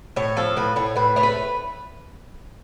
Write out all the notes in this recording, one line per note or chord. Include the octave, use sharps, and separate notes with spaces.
A2 C#5
F3 A4
A2 B4
A2 C#5
A2 B4
A3 C#5
B4